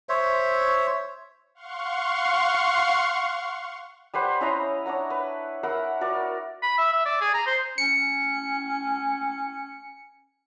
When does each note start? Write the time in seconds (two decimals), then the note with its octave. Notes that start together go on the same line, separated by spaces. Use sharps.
0.09 C5 C#5 E5
1.55 F5 F#5 C6 C#6
4.14 G3 B4 C5 F#5
4.40 C#4 E4 D#5 A#5
4.86 D4 C#5 F#5 A#5
5.10 B4
5.63 A#4 E5 F#5 B5
6.01 F#4 A#4 D5
6.62 B5
6.78 E5
6.93 E5
7.06 D5
7.21 G#4
7.34 A#5
7.46 C5
7.78 C#4 C#7